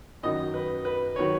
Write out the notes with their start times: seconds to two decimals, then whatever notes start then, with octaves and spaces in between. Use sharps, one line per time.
0.23 F#2 D#3 F#3 D#5
0.54 B4
0.85 B4
1.16 D#3 F#3 C#5